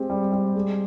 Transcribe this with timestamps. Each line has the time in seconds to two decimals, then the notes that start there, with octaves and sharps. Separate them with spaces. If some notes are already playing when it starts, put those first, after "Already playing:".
Already playing: G#3 C4 G4
0.10 G3
0.32 G3
0.55 G#3